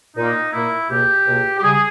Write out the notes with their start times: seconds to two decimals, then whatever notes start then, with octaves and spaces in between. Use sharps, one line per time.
0.17 A#2 A#3 D#4
0.53 A#2 A#3 E4
0.90 C#2 B2 A#3 G4
1.27 C#2 B2 A#3
1.58 G4
1.63 C#3 G3 G#4